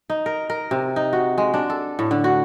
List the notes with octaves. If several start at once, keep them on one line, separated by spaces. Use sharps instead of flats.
D#4
A#4
A#4
C3
D#4
F#4
G#3
D4
A4
A2
D3
F#4